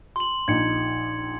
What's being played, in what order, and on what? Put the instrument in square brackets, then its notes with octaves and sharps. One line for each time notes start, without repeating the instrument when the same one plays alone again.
[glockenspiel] C6 F#7
[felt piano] A#1 D#4 [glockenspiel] G#6 C#7